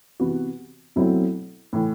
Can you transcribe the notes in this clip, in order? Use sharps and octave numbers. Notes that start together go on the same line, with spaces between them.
C3 E3 B3 F#4
B2 F#3 A3 C4 E4
A2 E3 A3